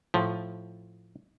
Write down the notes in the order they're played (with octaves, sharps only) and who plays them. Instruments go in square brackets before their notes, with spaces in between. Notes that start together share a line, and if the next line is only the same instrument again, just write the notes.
[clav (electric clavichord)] A2 F3